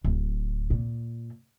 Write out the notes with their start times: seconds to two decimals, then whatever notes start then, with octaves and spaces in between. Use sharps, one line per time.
0.04 D1
0.70 A#2